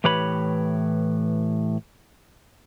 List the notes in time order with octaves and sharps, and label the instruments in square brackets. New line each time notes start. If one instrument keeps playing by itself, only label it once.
[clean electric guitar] A2 E3 G4 B4 C#5 B5